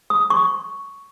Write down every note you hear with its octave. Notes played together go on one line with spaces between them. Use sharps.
D#6
C#6